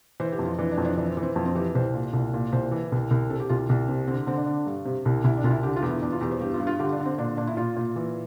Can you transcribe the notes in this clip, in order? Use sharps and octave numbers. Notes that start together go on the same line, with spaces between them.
E3 C5
G4
F2
F4
E3 D4
D4
F2
D4
E3 D4
C4
E3
C4
F2
C4
E3 G4
C2 C5
A#2
C2
A#2
C2 C5
E3
C2
C2
C3 A4
G4
C2 F4
C2
C3
D3 C4
D3 C4
D4
D3
G2
C3
C2
C2 E4
D4
C2 F4
E4
D3 G4
F4
E2
E4
E2 D4
F4
E2 G4
C5
G2 G4
F4
G2
F4
D3 G4
D4
D3
C4
A#2 D4
A#2 D4
E4
A#2 F4
A#2
E3